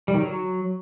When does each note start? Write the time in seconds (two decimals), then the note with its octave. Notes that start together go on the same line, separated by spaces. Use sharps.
0.08 G3
0.14 D#3
0.20 F#3